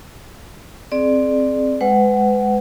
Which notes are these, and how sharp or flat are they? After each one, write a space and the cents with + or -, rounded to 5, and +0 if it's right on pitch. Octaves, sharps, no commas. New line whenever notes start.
C4 +5 G#4 +25 D5 +15
G#3 +0 B4 +35 F#5 +15